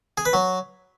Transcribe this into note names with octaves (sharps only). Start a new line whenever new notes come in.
G#4
B4
F#3